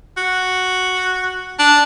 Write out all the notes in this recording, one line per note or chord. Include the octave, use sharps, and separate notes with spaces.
F#4
D4